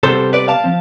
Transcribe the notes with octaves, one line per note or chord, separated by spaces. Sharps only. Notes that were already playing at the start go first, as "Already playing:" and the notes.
C3 G3 B3 A4 C5
B4 D5
F5 A5
F3 C4